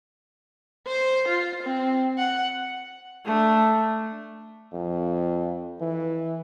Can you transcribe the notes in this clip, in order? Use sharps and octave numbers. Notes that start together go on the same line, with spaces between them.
C5
F4
C4
F#5
A3 D4
F2
E3